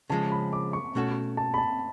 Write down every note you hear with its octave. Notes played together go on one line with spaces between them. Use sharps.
C#3 F3 G#3 A5
B5
D6
C#6
B2 A3 C#4 F#4 A4
A5
B5
A5